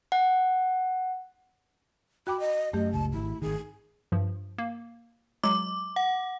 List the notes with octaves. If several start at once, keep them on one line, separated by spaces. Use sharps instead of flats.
F#5
F#4 G5 B5 D6
D#5
F#2 A3 G4 D#5
F#1 C#2 A5
G#1 E4
G#1 D#3 G#4
G2 F3
A#3
F#3 G#3 D6
F#5